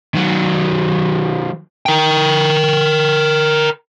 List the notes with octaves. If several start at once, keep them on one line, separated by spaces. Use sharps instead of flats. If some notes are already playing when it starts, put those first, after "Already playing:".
D#3 F#3
A#4 G5